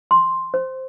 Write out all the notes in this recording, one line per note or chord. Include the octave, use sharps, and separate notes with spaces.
C6
C5